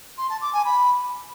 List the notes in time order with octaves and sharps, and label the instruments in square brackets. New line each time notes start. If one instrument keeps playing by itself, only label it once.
[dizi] C6
A5
D6
G#5
B5